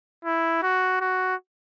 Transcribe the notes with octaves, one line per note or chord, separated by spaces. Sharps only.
E4
F#4
F#4